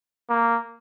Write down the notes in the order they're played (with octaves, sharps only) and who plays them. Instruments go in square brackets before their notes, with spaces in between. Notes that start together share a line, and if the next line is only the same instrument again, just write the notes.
[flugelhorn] A#3